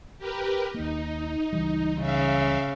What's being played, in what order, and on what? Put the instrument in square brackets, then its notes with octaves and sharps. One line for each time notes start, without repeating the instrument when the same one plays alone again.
[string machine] G4 A#4 B4
[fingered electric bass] D#2 A#3 [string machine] D#4
[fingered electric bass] C#2 E3 G3
[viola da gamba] C#3 [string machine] E5 F5